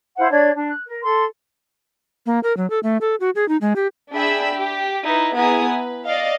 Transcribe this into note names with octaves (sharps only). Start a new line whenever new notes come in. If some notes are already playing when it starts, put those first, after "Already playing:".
E4 C5 F5 F#5
D4 C#5 D5 G#6
D4
F#6
A#4
A4 C6
A#3
A#4
F#3
A4
A3
A4
F#4
G#4
D#4
G#3
G4
D4 G#4 E5 G5 B5 E6
G4
D#4 E4 B4
B3 E4 G#4 G#5 A#5 D#6
B4
D5 D#5 F5